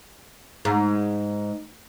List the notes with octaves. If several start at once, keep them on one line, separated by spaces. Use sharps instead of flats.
G#2